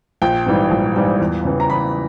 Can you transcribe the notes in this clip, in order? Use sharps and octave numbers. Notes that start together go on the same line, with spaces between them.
A#1 G5
G#2 E3 G3
A#1
G#2 E3 G3
E2
C#3 E3
A#5
E2 B5